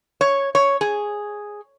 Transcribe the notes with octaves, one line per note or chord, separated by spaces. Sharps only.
C#5
C#5
G#4